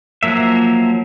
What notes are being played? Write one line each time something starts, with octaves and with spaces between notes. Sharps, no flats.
F3 F#3 A#3 E5